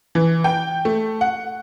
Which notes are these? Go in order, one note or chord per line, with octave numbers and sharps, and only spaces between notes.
E3
G5
A3
F#5